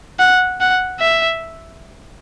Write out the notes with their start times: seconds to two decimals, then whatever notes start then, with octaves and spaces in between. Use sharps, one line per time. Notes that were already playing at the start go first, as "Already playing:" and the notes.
0.19 F#5
0.61 F#5
1.01 E5